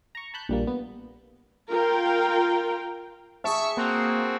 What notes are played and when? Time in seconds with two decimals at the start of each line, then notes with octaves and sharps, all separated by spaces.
0.15 A#5 C#6
0.34 A5 B5 F#6 G6
0.49 A#1 G3 A#3
0.67 B3
1.69 F4 A#4 F5 G5
3.44 G#4 E5 A5 C#6
3.77 A#3 C4 F#4